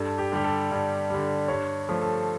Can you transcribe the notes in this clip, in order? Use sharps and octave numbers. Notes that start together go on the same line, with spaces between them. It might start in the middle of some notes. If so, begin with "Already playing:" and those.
Already playing: G2 A4
G4
D3 G3 G4
A4
G2
D3 G3
G2 C#5
F3 A3
A4